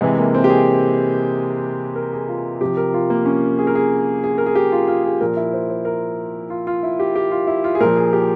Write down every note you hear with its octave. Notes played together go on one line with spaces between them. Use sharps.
C3 E3 G#3
A#3
C4
G4
G#4
A#4
G#4
F4
C3 F3 G4
A#4
F4
A#3
C#4
G#4
A#4
G#4
G#4
A#4
G#4
G4
F4
F4
G#4
A#2 F3 A#4
E4
C5
C5
A#4
F4
F4
E4
G4
G4
F4
E4
F4
G#4
A#2 F3 A#4
G#4
G4